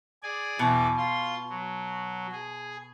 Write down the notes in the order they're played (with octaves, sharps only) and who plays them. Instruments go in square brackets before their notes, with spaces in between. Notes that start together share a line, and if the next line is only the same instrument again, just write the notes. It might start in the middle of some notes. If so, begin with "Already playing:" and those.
[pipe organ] G#4 D5 G#5
[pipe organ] E2 E3 D6 [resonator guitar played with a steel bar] B2
[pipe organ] F4 C6
F#3
G#4